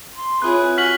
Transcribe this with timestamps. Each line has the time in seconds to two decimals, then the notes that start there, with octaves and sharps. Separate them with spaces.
0.16 C6
0.42 C4 E4 F4 G#4 B4 C#5 F#6
0.77 F#4 F#5 G#5 F6 B6 F#7